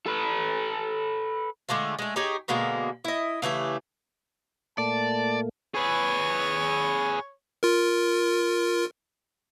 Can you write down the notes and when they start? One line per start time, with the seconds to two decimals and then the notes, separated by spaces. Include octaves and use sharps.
0.06 A4 B4
1.69 D3 G#3 A3 F4
1.99 G#3 A3
2.16 D#4 G4 G#4 C#5
2.48 B2 D3 G#3 A#3
3.05 E4 D#5
3.42 C#3 E3 A3 G4
4.78 A#2 A3 A#3 D5 A5
5.75 G#4 B4 C#5
7.63 F4 A#4